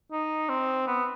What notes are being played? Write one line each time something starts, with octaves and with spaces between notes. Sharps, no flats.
D#4
C4
B3